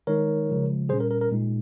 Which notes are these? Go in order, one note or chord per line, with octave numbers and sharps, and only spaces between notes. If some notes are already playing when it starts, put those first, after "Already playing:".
D#3 G#3 D#4 A#4 C#5
C#3 F3 G#3
A#2 G3 C#4 G#4 C5
A#4
A#4
A#4
A#2 G#3 D#4